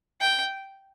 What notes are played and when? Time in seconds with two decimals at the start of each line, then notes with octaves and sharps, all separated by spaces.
0.21 G5